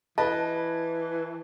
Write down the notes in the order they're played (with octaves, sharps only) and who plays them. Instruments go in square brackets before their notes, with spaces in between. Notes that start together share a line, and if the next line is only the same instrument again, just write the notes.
[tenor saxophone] E3 [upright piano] B4 D#5 [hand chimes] A5